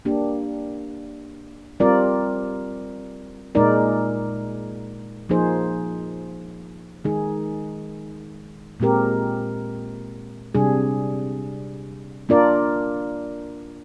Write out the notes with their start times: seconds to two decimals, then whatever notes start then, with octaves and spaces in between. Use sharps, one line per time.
0.05 A#3 D4 G4
1.80 G3 C4 F4 A#4 D5
3.55 A#2 G#3 D#4 A#4 D5
5.29 F3 A#3 D#4 G#4 C5
7.05 D#3 G#3 D#4 G#4
8.80 A#2 G#3 C4 G4 A#4
10.55 C3 G3 D4 G#4
12.29 A#3 D4 F4 A#4 D5